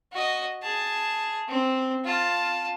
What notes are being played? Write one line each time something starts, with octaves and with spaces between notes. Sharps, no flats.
F#4 D#5
G#4 A5
C4
F4 A5